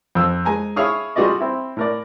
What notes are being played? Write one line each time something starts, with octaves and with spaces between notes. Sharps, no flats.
F2 E6
G#3 G#5 A#5
E4 G#4 C#5 F5 C#6 D#6
G3 F4 F#4 G#4 D5 D#5
C4 E4
A2 A#4 D5